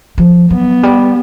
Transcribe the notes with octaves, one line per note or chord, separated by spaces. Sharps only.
F3
F#3 B3
G3